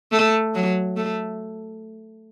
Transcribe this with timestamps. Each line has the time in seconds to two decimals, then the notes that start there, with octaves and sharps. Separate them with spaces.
0.12 A3
0.55 F#3
0.97 A3